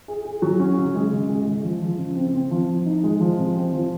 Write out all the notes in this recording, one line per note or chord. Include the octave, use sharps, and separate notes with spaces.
G#4
G#4
F#3
C#4
C#3
G#3
C#3
G#3
G#3
F3
F3
C#3
C4
C4
F3
F3
D#4
G#3
F3
C3
C4
F3